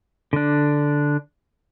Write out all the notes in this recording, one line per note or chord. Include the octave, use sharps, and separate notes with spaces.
D3 D4